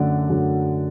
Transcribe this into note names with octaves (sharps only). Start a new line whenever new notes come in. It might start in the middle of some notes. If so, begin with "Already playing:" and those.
Already playing: F#2 D3 F#3 A3 D5 F#5
F#2 D3 F#3 A3